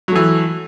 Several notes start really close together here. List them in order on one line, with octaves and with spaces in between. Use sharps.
F#3 A3 E3